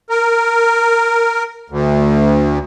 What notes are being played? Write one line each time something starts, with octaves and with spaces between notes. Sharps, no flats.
A#4
D2